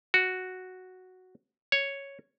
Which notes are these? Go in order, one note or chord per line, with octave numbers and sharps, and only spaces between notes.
F#4
C#5